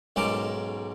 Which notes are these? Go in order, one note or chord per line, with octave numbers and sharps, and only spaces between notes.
B1 G#2 C#4 A4 A#4 D6